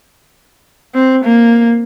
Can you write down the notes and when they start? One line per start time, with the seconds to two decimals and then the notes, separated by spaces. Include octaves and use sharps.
0.95 C4
1.24 A#3